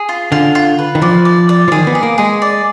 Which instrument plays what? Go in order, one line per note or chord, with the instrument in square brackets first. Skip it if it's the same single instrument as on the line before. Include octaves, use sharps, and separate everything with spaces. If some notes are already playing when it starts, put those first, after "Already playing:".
Already playing: [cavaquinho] G#4
F4
[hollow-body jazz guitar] D3 [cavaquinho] F4
[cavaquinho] F4
B4
[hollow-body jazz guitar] D#3
[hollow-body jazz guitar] F3 [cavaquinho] D5
[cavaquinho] D5
D5
[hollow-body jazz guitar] F3
[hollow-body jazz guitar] D#3 [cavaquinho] G#4
[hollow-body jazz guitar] B3
[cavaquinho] G#4
[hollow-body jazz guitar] A#3
[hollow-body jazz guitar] G#3 [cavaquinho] G#4
[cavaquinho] D5